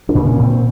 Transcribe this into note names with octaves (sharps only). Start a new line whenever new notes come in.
D4
A#2
C#4
A#2
C4